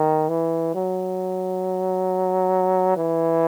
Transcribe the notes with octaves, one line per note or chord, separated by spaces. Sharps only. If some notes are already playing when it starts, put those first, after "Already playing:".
Already playing: D#3
E3
F#3
E3